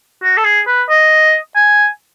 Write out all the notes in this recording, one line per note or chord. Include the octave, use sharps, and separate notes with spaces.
F#4
A4
G#4
B4
D#5
G#5